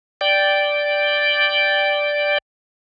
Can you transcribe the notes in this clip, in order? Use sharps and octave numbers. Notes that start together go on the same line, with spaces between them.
D5 G5